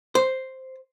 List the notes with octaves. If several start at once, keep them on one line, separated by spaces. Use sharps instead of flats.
C5